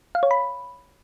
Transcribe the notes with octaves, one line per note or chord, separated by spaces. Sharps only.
F5
C#5
B5